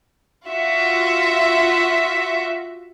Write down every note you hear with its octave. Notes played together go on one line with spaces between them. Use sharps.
F4 F#4 E5